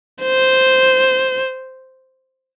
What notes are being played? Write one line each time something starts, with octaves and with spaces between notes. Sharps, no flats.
C5